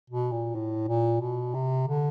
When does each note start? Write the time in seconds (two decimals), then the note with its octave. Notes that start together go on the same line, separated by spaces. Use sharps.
0.10 B2
0.32 A#2
0.55 A2
0.88 A#2
1.21 B2
1.54 C3
1.87 D3